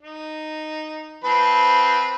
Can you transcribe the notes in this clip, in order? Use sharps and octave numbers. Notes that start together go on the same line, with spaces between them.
D#4
F3 C4 B4